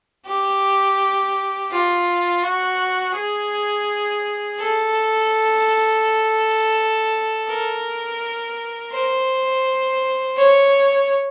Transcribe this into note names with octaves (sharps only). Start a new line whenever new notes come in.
G4
F4
F#4
G#4
A4
A#4
C5
C#5